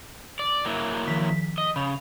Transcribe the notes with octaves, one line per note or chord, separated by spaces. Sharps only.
D5
F#3 A#3 E4
D#3 F3 B6
D#5
C#3 B5 F7